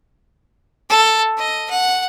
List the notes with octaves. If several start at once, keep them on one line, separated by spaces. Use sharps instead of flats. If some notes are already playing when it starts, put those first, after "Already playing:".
A4
D#5
F#5